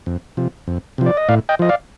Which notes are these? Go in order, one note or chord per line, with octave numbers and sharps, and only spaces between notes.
F2
C3 F3
F2
C3 F3
D5
D#5
A2 D5 F5
D#5 G5
F3 D#5
D5 F5